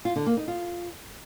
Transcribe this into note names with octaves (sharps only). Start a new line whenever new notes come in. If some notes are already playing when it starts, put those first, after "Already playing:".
F4
D3
A#3
D#4
F4